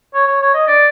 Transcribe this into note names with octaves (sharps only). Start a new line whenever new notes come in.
C#5
C#5
C#5
D#5
D5